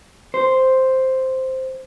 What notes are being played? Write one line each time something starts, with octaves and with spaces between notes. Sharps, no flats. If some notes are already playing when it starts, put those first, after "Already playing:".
C5